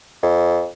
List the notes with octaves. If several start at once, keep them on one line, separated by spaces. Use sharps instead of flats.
F2